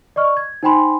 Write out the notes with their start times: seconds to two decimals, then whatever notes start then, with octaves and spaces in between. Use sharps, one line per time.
0.16 D5 D#5 C#6 F6
0.37 G#6
0.63 D#4 C5 G5 G#5 B5 C6